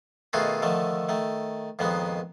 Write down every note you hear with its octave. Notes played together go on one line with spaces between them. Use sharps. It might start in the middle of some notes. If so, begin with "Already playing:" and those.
B2 D#3 A3 F4 F#4 G#4
D3 D#3 F3 A3
D#3 A3
F2 A#2 D#3 G#3 B3